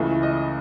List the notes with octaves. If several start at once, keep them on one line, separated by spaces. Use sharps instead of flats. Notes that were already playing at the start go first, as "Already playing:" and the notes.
Already playing: C#2 C#3 E3 A3
D#5